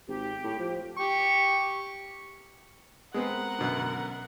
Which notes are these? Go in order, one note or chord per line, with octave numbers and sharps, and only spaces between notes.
G#1 G4
A2
F3
G4 C#6
G#3 B3 C4 A#4 F#5
F#2 B2 D3